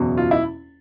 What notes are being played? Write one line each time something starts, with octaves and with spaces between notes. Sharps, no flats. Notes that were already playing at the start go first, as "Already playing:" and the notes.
Already playing: F#1 E2 B2
F4
E4